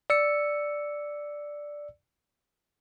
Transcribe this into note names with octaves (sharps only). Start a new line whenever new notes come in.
D5 E6 C#7